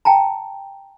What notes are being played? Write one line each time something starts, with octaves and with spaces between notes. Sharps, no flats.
G5 A5 A#5